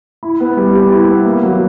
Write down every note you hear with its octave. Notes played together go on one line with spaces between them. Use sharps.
E4
B3
G3
G4
E4
B3
A#3
F#3